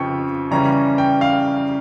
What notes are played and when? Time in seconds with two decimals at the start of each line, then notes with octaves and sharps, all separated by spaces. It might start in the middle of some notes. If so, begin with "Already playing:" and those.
Already playing: F2 C#3 F3 G5 C#6
0.51 C#3 E3 G3 C#4 A#5
0.98 G5
1.21 F5